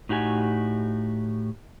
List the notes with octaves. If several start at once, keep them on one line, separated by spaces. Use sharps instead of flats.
A2 D#4 F#4 G4 G#5